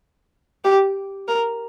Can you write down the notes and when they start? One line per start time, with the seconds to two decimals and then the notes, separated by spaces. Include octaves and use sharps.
0.64 G4
1.28 A#4